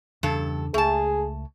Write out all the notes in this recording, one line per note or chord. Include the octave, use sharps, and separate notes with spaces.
E2 G2 C#3 A4
C#2 A3 G#4 A5